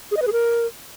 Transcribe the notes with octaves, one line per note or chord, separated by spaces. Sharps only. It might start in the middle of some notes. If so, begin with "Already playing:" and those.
G#4
D#5
B4
G#4
A#4